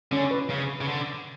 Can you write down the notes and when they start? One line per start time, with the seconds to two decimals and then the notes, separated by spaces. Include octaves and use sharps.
0.12 D3 C#4
0.31 B4
0.50 C#3
0.81 C#3
0.88 D3